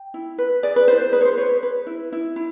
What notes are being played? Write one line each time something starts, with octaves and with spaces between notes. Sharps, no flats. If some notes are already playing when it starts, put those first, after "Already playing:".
Already playing: G5
E4
B4
G#4 D5
B4
E4 C5
C5
G#4 B4
C#5
C5
B4 C#5
B4
E4
E4
E4